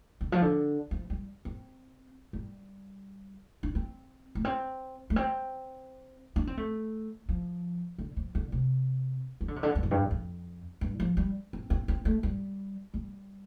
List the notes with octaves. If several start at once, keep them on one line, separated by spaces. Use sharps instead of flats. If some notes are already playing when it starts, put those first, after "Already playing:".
D3
F3
D3
F3
G3
C4
G3
D4
C4
A3
C4
A3
C4
D4
C4
A3
F3
D3
F3
D3
C3
F3
D3
C3
D3
G2
F2
G2
F2
G2
F3
G3
C4
C4
C4
A3
G3
G3